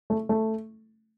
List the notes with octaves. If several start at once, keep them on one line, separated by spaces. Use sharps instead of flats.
A3
A3